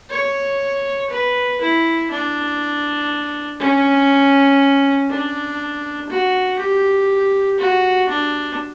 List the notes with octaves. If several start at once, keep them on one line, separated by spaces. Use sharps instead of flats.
C#5
B4
E4
D4
C#4
D4
F#4
G4
F#4
D4